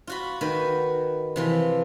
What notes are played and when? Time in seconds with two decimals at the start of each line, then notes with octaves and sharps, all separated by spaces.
0.07 F4 F#4 B5
0.41 D#3 F#4 B4
1.36 C3 E3 F3